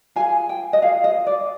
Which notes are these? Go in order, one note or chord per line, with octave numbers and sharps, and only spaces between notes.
F4 G#4 G#5
G5
D#5
F4 G#4 F5
D#5
D5